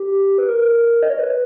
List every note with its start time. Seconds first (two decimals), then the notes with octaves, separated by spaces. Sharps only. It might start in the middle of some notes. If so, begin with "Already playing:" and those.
Already playing: G4
0.38 B4
0.48 A#4
1.03 D#5
1.10 C#5
1.19 B4